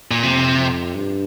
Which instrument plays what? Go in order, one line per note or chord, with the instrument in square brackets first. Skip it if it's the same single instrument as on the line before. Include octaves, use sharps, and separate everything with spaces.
[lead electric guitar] A#2
[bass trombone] F2 [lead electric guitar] C3
[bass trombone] F2
G2